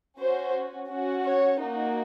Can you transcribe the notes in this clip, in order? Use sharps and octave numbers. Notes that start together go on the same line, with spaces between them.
C#4 F#4 C5
C#4 F#4
C#5
A#3 D#4 F#4